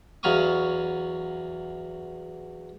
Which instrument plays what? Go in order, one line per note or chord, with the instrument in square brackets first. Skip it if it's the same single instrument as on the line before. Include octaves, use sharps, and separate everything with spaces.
[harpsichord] E2 F#3 F5 B5 C#6 D#6